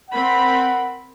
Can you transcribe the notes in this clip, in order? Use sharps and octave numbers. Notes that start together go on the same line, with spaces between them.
C4 A#4 F#5 B5